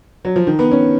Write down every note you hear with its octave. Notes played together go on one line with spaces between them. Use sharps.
F#3
F3
D#3
B3
C#4